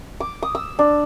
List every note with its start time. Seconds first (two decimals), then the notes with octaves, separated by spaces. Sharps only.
0.20 D6
0.43 D#6
0.55 E6
0.79 D4